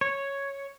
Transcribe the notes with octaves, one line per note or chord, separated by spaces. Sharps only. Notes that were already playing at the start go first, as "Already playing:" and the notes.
C#5